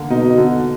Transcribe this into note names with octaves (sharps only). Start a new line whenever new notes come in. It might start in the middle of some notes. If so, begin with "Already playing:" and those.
Already playing: D3 A#3
B2 D#4
D3